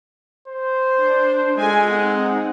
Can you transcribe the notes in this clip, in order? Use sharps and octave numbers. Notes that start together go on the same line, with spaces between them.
C5
D4
G#3 F4 A4 G#5
C4 D#4 F#5